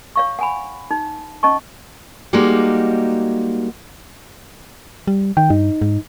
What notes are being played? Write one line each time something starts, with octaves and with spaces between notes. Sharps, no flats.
C#5 F5 C#6
F#5 G#5 B5
D#4
C#4 D#5 A5 C#6
G3 G#3 A#3 D#4 F#4 G4
G3
D#3 G5
G2 D#4
G#2